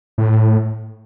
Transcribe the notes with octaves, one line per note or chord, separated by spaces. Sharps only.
A2